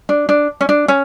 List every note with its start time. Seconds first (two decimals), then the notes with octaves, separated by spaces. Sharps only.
0.09 D4
0.29 D4
0.61 C#4
0.69 D4
0.88 C#4